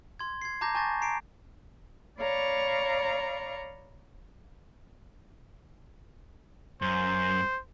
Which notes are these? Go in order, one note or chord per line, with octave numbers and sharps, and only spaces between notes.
C6 G#6
G#6 C7
A5 A#5 D6 G6 A#6
G#5 A5 C#6 G6 A6 A#6
A#5 C7 D7
C#5 D5 F5 A#5 B5 C#6
F#2 C5